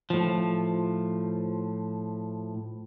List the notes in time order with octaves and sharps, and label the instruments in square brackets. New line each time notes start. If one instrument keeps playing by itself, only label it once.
[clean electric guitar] A2 F3